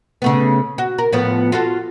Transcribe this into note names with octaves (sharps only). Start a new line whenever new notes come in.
C#3 A3 B3
F#4
A#4
A2 F3 B3
F4 F#4 A4